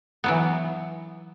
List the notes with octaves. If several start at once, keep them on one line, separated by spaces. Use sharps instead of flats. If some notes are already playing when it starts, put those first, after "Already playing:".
E3 F#3 B3